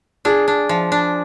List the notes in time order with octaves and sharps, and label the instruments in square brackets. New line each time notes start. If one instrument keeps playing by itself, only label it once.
[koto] D4 [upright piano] G#4
[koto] D4
F3
D4